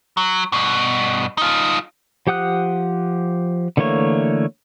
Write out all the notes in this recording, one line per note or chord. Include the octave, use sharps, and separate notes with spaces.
F#3
G2 B2
D#4 F4
F3 G4 F#5 D#6 F#6
D3 E3 A3 A#3 C#5